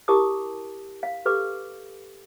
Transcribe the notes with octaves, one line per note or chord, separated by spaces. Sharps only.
E4 G4 A#4 A5 D6 D#6
F5
G4 A4 B4 D6